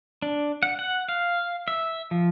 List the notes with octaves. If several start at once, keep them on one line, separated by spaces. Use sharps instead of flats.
D4
F#5
F#5
F5
E5
F3